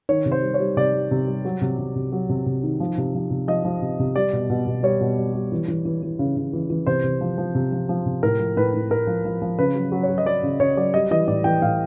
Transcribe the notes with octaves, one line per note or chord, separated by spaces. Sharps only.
D#3 C#5
C3
C5
G3
C#5
G3
C3 D5
G3
C3
G3
F#3
C3
C3
C3
F#3
C3
C3
D#3
F3
C3
F3
C3
F3 D#5
F3
C3
C3
G3 D5
B2
B2
B2
G3 C#5
B2
G3
G3
E3
E3
E3
E3
C#3
C#3
E3
E3
C3 C5
C3
F3
F3
C3
F3
F3
C3
A2 A#4
F3
A2 B4
A2
A2 A#4
F3
F3
F3
C#3 B4
F#3
F#3
C#5
F#3
D#5
F#3 D5
C#3
C#3 C#5
F#3 D5
G3 D#5
E3 D#5
A2 D5
E3 G5
A2 F5